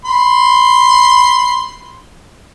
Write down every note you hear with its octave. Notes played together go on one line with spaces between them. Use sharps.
B5 C6